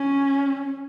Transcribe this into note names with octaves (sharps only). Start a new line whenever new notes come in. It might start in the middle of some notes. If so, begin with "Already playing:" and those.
Already playing: C#4